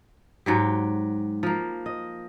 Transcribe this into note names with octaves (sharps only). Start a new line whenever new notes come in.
G#2 F#3 G4
F3 A#3
D#5